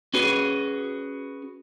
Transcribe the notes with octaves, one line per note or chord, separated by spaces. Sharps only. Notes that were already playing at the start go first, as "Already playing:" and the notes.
C#4 F#4 G#4 B4